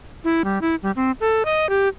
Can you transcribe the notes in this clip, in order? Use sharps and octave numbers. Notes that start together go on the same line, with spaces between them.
E4
G3
E4
G3
C4
A4
D#5
G4